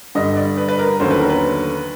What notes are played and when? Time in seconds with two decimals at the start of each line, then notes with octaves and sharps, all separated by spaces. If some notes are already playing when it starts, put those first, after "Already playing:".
0.15 G2 D3 G3 D#5
0.37 D5
0.57 B4
0.68 B4
0.79 A#4
1.00 D#2 D3 F#3 A3 C#4 C5
1.11 B4
1.20 A#4
1.30 B4